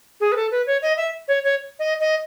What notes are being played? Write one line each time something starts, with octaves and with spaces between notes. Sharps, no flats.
G#4
B4
A4
B4
C#5
D#5
E5
C#5
C#5
D#5
D#5